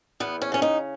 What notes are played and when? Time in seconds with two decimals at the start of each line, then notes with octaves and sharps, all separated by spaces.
0.20 E2 B3
0.42 C#4
0.52 C#3 C#4
0.62 D#4